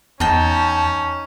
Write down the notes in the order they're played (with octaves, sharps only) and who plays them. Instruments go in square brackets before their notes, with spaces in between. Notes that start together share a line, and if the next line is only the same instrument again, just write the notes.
[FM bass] E2 [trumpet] C#4 [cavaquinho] D#4 G5 [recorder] A5